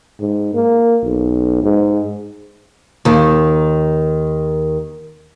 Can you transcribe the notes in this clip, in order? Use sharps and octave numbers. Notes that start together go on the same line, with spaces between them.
G#2
A#3
B1
G#2
D#2 D#3